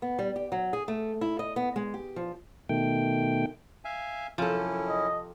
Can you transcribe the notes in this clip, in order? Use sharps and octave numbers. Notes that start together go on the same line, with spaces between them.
B3
G3
G4
F#3
G#4
A3
E4
D#5
B3
G#3
G4
F3
B2 D#3 A3 G5
E5 F5 G#5
F#2 C3 F3 C#4 E4 A4
D#5